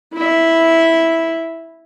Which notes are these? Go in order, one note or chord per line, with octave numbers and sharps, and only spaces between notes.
E4 E5